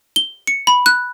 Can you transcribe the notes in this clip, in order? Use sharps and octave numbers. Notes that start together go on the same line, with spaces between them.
G7
C#7
B5
F#6